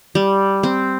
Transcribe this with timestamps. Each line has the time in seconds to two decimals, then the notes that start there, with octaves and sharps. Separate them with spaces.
0.15 G3
0.63 C4